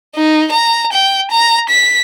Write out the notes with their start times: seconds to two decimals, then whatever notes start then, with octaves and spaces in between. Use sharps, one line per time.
0.16 D#4
0.52 A#5
0.93 G5
1.31 A#5
1.69 B6